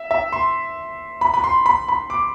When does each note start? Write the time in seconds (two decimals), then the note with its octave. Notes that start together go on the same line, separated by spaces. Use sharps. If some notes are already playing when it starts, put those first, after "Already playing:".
Already playing: E5
0.11 E5
0.32 C6
1.21 B5
1.34 B5
1.44 C6
1.66 B5
1.88 B5
2.10 D6